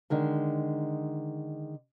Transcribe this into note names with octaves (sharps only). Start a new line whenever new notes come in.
D3 D#3 G#3